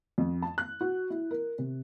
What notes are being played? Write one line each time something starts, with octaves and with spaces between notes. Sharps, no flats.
F2
A5
F#6
F#4
E4
A#4
C3